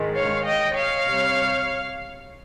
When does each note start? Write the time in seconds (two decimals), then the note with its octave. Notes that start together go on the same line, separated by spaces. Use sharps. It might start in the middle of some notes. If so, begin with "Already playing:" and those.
Already playing: G#2 D#3 G#3
0.16 C#5 F5
0.45 D#5 G5
0.75 C#5 F5
1.05 C3 G3